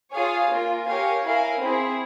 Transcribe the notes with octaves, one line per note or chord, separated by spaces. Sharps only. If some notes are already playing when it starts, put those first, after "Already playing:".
F4 G#4 C#5 F5 G#5
A#3 F4 A#4
G4 A#4 C#5 F5 G#5
E4 A#4 F5 G#5
C4 E4 G#4